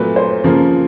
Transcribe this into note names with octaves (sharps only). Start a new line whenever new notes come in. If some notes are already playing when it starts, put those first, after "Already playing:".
Already playing: A#2 F#3 A3 B4
C5
C#3 F3 A#3